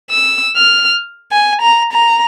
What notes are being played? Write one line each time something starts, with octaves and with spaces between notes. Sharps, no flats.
E6
F6
G#5
A#5
A#5